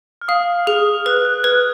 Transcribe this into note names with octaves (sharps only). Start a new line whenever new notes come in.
F6
F5 D#6
G#4 F6
B4 F#6
F#6
B4 G#6